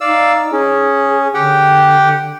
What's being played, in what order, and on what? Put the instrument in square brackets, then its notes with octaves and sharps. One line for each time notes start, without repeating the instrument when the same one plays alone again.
[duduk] D#4 [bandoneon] D5 F5 E6
[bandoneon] C#4 [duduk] G#4
[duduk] D3 [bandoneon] G4 F#5 G5